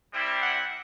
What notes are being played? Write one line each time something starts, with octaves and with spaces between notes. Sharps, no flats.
G3 C4 E4
F#5